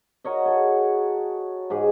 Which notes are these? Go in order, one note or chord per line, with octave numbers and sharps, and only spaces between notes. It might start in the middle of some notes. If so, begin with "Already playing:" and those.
F#4 A#4 C#5 D#5
G#4 A4
G#2 G4 G#4